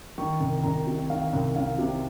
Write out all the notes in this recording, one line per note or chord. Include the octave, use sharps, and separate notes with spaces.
D#3 C#6
C2
C2 A#5
C3
D#3 F5
C2
C2 F5
C3